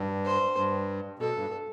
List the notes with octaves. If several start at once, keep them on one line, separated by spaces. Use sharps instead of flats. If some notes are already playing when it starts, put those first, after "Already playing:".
Already playing: G2
C5
G2
B2 A4
G2